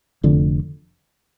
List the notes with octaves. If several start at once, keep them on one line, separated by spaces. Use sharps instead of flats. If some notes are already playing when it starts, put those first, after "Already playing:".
F1 F2 D3